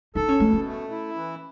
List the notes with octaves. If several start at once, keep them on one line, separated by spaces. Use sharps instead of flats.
D#4 A4
C#4
B2 A3
C#4
A3
E4
E3